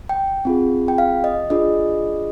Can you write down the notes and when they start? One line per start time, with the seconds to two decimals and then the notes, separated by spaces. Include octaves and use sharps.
0.09 G5
0.45 C4 F4 G#4
0.88 G5
0.98 F5
1.24 D#5
1.50 D4 F4 G#4 D#5